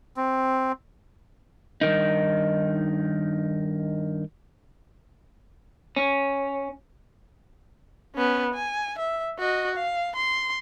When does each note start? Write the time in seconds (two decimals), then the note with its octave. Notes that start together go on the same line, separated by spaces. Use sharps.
0.17 C4
1.81 G2 C3 D#3 D#4
5.96 C#4
8.15 B3 C#4
8.54 G#5
8.98 E5
9.39 F#4 D#5
9.75 F5
10.16 C6